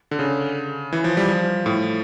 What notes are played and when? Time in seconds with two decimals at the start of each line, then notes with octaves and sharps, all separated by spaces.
0.11 D3
0.19 C#3
0.93 E3
1.04 F3
1.17 G3
1.29 F3
1.66 A2